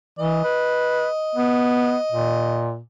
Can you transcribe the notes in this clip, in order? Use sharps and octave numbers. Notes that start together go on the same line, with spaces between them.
E3 D#5
B4
B3
A#2